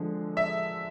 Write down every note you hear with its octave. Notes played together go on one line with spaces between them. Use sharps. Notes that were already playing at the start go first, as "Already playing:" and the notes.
Already playing: D3 F3 G#3
E5